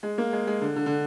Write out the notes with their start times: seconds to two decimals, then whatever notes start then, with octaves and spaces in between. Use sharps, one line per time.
0.03 G#3
0.18 A#3
0.33 G#3
0.47 G#3
0.61 D3
0.76 D3
0.86 D3